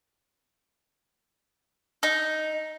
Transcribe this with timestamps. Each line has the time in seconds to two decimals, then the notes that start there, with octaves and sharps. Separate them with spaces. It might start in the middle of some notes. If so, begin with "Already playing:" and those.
2.03 D#4